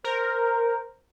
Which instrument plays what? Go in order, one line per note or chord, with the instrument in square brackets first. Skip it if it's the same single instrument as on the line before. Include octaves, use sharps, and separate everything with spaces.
[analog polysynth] A#4 [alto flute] C5